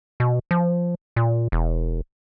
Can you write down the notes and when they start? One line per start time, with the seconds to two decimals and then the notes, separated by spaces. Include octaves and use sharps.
0.20 B2
0.51 F3
1.16 A#2
1.52 E1